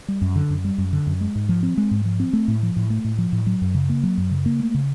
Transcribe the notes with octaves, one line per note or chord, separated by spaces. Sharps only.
G3
F#2
D3
F#2
G3
F#2
D3
F#2
G#3
G#2
F3
C4
G#3
G#2
F3
C4
A3
A2
F3
A2
A3
A2
F3
A2
F#3
F#2
C#3
A#3
F#3
F#2
C#3
A#3
A3
C#3